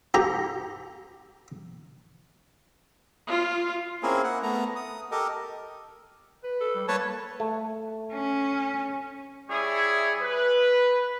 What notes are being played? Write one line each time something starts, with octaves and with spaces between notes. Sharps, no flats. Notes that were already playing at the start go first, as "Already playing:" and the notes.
G4 A#5
F4
A#3 C4 C#4 E4 G#4 A#4
F#5
A3 B3 A#5
D#6
G4 A4 A#4 D#5
B4
A4
G3
G3 A#3 B4 C#5 A5
A3
C#4
G3 E4 G#4 C#5
B4